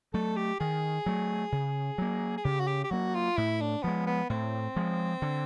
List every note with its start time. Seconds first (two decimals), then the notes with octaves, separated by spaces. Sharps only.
0.14 F#3 A3 A4
0.37 G4
0.60 D#3 G#4
1.06 F#3 A3
1.52 C#3
1.98 F#3 A#3
2.38 G#4
2.44 C#3 G4
2.60 F#4
2.68 G4
2.84 G4
2.91 F#3 A#3 F#4
3.15 F4
3.37 A2 E4
3.61 D4
3.83 F3 G#3 B3
4.07 B3
4.30 A2 C4
4.76 F3 G#3
5.22 D3